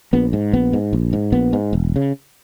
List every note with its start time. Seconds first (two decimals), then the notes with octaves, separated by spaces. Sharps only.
0.13 A#1 B3
0.33 G#2
0.53 A#1 B3
0.73 G#2
0.93 A#1
1.13 G#2
1.32 A#1 B3
1.53 G#2
1.73 E1
1.96 C#3